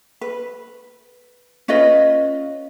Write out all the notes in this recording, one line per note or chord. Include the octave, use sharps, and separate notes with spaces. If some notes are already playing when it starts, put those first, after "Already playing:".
B4
C#4 F4 B4 D#5